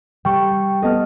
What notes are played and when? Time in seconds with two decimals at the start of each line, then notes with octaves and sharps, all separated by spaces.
0.25 G3 G5 C#6
0.82 B3 A4 D#5 A5 F6